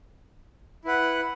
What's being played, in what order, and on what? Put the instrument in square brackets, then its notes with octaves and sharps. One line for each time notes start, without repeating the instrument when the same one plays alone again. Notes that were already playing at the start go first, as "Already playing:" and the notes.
[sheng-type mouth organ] E4 B4 F#5